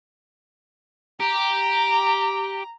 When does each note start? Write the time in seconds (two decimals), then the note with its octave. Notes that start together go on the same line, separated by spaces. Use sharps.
1.20 G4 A#5